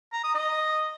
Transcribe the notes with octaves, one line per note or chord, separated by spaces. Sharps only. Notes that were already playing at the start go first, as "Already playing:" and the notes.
A#5
D#6
D#5